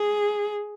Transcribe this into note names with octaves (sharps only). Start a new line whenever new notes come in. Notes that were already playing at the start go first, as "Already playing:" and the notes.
Already playing: G#4